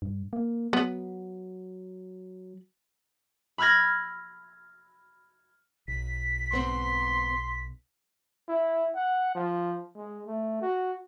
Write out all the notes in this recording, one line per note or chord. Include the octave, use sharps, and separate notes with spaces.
G2
A#3
F#3 B3
B5 E6 F6 G#6 A#6
B1 B6
G#2 B3 C4 C6
E4
F#5
F3
G#3
A3
F#4